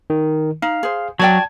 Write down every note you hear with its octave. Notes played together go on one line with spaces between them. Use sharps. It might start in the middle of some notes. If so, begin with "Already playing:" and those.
D#3
D#4 F5
G#4 C5
F#3 F#4 D5 G5 A5 G#6